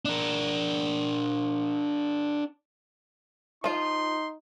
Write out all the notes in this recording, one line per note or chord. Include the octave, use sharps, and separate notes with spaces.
D4 A#4
F3 D#4 F4 C6